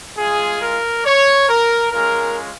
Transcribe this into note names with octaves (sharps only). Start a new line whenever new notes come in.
G#3 F4 G#4
A#4
C#5
A#4
G#3 C#4 F4 A#4